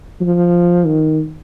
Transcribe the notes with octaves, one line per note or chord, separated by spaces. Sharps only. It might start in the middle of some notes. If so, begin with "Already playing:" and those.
F3
D#3